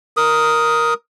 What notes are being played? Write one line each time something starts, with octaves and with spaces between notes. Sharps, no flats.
A#4 D#6